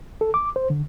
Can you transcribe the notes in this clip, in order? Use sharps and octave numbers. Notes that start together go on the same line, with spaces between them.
A4
D6
C5
D3